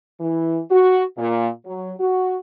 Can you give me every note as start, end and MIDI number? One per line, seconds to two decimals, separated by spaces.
0.20 0.59 52
0.71 1.02 66
1.17 1.47 46
1.65 1.92 54
2.00 2.35 66